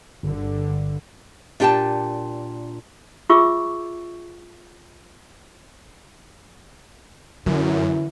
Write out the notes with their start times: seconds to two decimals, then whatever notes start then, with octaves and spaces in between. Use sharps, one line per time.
0.23 G1 G2 D3
1.60 A#2 D4 G4 D5 G5 A5
3.30 F4 G#4 E5 C#6 D6 E6
7.46 F#2 D3 E3 F#3 E4